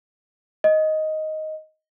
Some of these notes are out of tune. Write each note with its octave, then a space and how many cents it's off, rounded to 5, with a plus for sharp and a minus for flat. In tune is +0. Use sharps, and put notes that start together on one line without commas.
D#5 +5